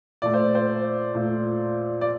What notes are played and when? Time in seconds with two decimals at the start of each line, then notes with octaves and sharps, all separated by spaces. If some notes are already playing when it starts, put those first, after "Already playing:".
0.22 A#2 A3 D5
0.34 C5
0.55 C5
1.15 A#2 A3
2.01 D5